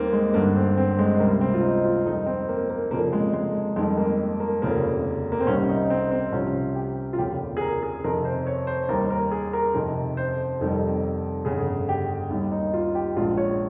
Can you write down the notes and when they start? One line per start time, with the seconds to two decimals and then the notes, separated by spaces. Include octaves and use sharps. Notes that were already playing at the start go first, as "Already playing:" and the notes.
Already playing: D#2 D#3 G3 A#3 C4
0.13 G#3
0.34 G1 G2 D#3 A#3
0.56 C4
0.77 C4
0.99 G#3
1.20 C#2 C3 G3 A#3
1.41 C4
1.54 F4
1.62 D#4
1.84 F4
2.05 F2 D#3 G3 D#4
2.26 C4
2.49 A#3
2.70 A#3
2.91 F1 F2 C#3 F3 A#3
3.13 G#3
3.34 G#3
3.76 F2 D#3 G3 G#3
3.98 A#3
4.40 A#3
4.62 F1 D#2 C#3 F3 A#3
5.32 A#3
5.40 C4
5.47 C2 C3 D#3 G3 C#4
5.69 D#4
5.90 C4
6.11 C4
6.32 C2 C3 F3 C#4
6.75 G4
7.13 F4
7.18 F1 D#2 C#3 F3 G4
7.57 G#4
7.61 A#4
7.83 G#4
8.04 F2 C3 D#3 A#4
8.25 C5
8.47 C#5
8.67 C5
8.88 D#2 D#3 G3 A#4
9.10 A#4
9.31 G#4
9.53 A#4
9.74 F2 C3 D#3
10.17 C5
10.60 F1 F2 D#3 G3
11.45 G1 F2 C#3 G#4
11.89 G4
12.30 D#2 D#3 G3
12.52 D#4
12.74 F4
12.95 G4
13.16 A#1 G#2 F3 F4
13.37 C#5